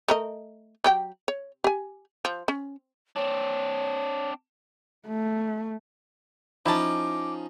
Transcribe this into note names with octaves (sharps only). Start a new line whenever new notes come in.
A3 A#4 D#5
F#3 G4 G5
C#5
G4 G#5
F3
C#4
C4 D4 C#5
A3
F3 C#4 D#4 E4 A5 D6